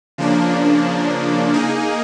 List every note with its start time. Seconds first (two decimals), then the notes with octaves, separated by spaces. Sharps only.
0.18 C#3 F3 A#3 D4
1.54 A#3 D#4 G#4